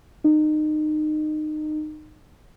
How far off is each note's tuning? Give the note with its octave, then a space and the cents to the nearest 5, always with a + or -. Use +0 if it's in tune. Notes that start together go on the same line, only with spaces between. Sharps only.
D#4 -25